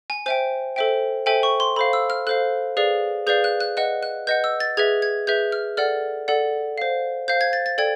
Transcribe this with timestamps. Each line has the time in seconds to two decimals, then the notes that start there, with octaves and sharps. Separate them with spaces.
0.10 G#5
0.26 C5 E5 G5 G#5
0.76 A4 C5 E5 G5
1.26 A4 C5 E5 G5 G#5
1.43 C#6
1.60 C6
1.76 A4 C5 F5 B5
1.93 E6
2.10 F6
2.27 A4 C5 F5 F#6
2.77 G#4 B4 D5 F5
3.27 G#4 B4 D5 F5 G6
3.44 F#6
3.60 F#6
3.77 B4 D#5 F#5 F#6
4.03 F#6
4.27 B4 D#5 F#5 G6
4.44 E6
4.60 A6
4.77 G#4 B4 E5 G#6
5.02 G#6
5.27 G#4 B4 E5 G6
5.52 F6
5.77 A4 D5 F#5 F6
6.28 A4 D5 F#5
6.78 C5 F5
7.28 C5 F5 G6
7.41 G#6
7.53 A6
7.66 A6
7.78 A4 D5 G5 G#6